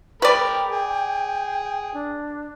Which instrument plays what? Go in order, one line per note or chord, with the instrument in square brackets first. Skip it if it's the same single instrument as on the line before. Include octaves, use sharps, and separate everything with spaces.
[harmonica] G#3 A#4 B5 [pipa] B4 D5 [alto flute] G5
[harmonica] G#4
[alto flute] D4